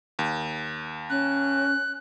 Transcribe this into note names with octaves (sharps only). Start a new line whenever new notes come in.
D#2
C#4 F#6